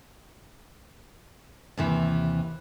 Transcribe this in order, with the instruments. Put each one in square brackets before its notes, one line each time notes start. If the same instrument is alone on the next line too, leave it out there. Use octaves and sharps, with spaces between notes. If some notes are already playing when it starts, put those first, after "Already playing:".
[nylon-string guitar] D#2 C3 E3